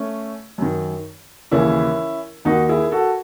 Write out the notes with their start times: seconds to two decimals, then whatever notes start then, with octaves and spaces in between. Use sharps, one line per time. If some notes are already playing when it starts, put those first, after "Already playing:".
Already playing: A3 C#4
0.58 F#2 D#3
1.51 D#2 C#3 E3 C#4 E4
2.45 D#2 D#3 D#4 F#4
2.69 E4 G#4
2.92 F#4 A4